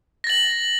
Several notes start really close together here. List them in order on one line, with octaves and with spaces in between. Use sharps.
A#6 A6 F#7